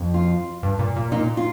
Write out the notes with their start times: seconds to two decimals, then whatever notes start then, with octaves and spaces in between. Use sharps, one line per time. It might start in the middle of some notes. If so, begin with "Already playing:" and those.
Already playing: F2
0.14 F4
0.63 G2
0.79 A#2
0.96 A#2
1.12 A#2 D#4
1.37 F4